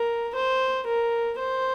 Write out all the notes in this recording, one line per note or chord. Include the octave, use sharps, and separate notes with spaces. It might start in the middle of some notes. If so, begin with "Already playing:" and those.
Already playing: A#4
C5
A#4
C5